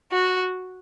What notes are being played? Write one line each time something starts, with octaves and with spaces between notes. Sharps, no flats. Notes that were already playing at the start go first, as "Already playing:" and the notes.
F#4